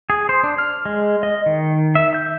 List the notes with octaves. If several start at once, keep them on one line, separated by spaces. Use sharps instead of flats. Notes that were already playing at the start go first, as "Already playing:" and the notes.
G#4
C5
D4
F6
G#3
D#5
D#3
E5
G6